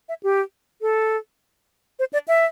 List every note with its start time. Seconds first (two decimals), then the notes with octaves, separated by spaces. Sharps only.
0.09 E5
0.23 G4
0.81 A4
1.99 C5
2.13 D5
2.28 E5